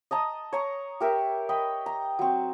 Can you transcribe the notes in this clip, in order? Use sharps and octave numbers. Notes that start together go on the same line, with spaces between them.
D#5 A5 A#5 D#6
C#5 A#5
G4 A#4 E5
D#5 G5 B5
A#5
F#3 C4